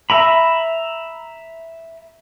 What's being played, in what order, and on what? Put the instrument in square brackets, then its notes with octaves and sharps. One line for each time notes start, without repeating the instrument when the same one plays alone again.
[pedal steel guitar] E5 A#5 B5